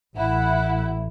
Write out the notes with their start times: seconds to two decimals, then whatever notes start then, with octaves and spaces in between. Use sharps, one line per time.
0.17 A1 E4 F#5